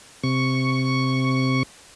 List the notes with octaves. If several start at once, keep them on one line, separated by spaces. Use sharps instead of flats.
C3 C#6